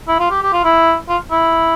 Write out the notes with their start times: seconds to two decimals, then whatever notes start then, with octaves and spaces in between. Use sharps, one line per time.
0.08 E4
0.19 F4
0.31 G4
0.42 G4
0.53 F4
0.64 E4
1.09 F4
1.31 E4